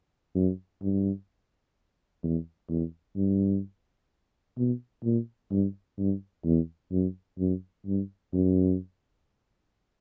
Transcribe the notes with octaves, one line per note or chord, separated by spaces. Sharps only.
F#2
G2
E2
E2
G2
B2
A#2
G2
G2
E2
F#2
F#2
G2
F#2